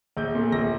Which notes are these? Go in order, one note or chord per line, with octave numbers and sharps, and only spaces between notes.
A#1 G6
A#2 A3
A#1 A#6